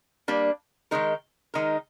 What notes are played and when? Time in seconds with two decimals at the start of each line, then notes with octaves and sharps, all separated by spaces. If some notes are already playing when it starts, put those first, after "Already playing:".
0.28 G3 A#3 D4
0.91 D#3 G#3 D#4 A#4
1.54 D#3 G#3 D#4 A#4